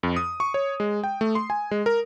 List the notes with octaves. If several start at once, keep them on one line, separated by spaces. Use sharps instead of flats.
F2
D#6
C#6
C#5
G#3
G5
A3
C6
G#5
G#3
A#4